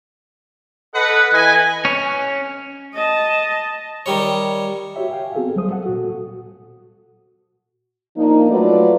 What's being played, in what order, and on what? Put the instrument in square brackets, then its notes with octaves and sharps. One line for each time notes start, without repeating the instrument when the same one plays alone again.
[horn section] A4 B4 D#5 F#5
E3 B4 D#5 G#5
[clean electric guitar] C#4
[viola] D#5 A5
[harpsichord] D#3 G3 C#5
[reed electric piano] F#4 G4 C#5 E5 G5
F5 G5 G#5
B3 C4 F#4 G#4 A4
C#2 F#3 G3 A4 C5 D#6
A4 F#5
A#2 F#4
[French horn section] F3 A#3 D4 D#4
F#3 A3 F4 F#4 B4 D5